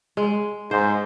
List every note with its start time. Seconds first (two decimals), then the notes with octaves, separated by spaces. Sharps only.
0.17 G#3
0.71 G#2 C5